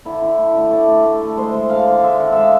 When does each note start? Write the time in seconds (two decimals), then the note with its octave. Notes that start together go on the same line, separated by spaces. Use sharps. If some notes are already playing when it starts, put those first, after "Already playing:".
0.05 D3 E4
0.22 D3
0.38 A3
0.55 D3
0.71 A3 D5
0.89 D3
1.05 A3
1.21 A3
1.37 G#3 C5
1.54 G#3
1.70 D3 F5
1.87 D3
2.03 G#3 E5
2.20 D3
2.32 G#3 E5 F5